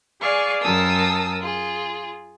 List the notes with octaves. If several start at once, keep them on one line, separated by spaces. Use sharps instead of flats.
G#4 D5 F5 G#5 C#6
F#2 A#4 A5 D#6 E6
F4 G#4